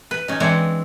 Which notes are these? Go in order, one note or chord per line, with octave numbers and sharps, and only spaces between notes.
B4
C#4 D#4
E3 G#3 C4 D4 C#5